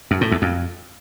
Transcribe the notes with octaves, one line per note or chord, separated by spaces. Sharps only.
F#2
A2
E2
F2